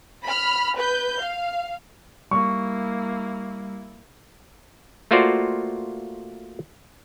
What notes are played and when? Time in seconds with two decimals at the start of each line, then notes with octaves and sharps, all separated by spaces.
0.25 B5 F6
0.76 B4 G6
1.21 F5
2.31 G3 A#3 E4 C#6
5.11 A3 A#3 F4 F#4 C5 D5